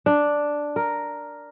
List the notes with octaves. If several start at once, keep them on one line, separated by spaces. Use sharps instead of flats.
D4
A#4